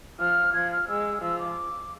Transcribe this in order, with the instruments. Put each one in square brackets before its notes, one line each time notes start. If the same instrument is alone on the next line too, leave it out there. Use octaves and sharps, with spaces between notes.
[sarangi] F3 [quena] F6
[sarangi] F3 [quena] G#6
[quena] F6
[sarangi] G#3 [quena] E6
[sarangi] F3 [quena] E6
[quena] D6